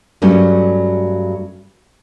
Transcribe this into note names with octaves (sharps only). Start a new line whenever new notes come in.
G2 F#3 G3 A3 C#4